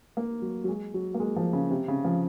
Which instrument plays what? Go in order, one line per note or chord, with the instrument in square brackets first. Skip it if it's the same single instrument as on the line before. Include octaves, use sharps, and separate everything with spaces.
[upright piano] A#3
F#3
F#3
G#3
F#3
A#3
G#3
F3
C#3
C3
C#3
F3